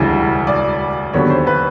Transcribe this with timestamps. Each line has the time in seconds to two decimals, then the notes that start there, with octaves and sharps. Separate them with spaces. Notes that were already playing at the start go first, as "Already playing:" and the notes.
Already playing: E1 D2 C#3 E3 G3
0.47 D5
1.13 D#2 D3 F#3 B3 C#5
1.30 C5
1.47 B4